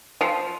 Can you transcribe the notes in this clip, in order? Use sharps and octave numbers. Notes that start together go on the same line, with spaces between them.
F3